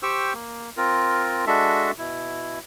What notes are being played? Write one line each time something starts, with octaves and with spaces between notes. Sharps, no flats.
G4 C5 G5 C#6 E6
A#3
C4 F4 A#4
G#3 D4 F#4 A4 E5
B2 E4